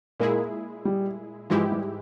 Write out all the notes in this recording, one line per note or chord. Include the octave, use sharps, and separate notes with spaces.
A#2 G#3 A#3 E4 G#4
G3
G#2 E3 F3 G#3 E4 G4
G3